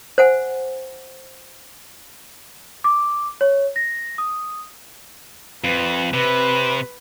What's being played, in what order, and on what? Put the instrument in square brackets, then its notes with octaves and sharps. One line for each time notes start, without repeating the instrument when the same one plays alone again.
[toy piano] C5 F#5 G#5
[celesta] D6
C#5
A#6
D#6
[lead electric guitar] F2 [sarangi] B4
[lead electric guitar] C3 [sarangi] B4